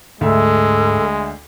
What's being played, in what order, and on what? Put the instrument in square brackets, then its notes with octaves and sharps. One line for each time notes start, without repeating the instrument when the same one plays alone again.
[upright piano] D2 E5 [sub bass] G#2 [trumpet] G#3 [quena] A4